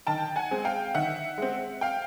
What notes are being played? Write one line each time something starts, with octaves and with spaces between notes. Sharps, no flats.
D#3 G5 A5
F#5 G#5
G#3 C4
F5 G5
D#3 E5 F#5
G#3 C4
F5 G5